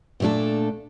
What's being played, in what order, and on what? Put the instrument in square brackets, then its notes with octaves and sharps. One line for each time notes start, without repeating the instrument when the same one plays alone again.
[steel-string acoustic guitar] A#2 A3 D4 A4